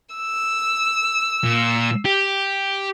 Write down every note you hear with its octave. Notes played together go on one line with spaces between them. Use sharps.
E6
A#2
G4